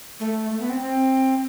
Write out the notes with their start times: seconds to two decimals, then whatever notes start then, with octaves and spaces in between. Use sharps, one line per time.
0.20 A3
0.50 A3
0.60 B3
0.69 C4
0.80 C4